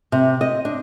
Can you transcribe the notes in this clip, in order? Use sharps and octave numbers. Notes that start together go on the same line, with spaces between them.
C3
D#5
D4